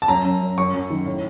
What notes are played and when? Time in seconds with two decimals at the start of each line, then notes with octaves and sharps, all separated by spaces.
0.02 A5
0.08 F#2 A#5
0.24 F#2
0.41 F#2
0.58 F#2 C#6
0.74 F#2
0.90 D#3
1.07 A2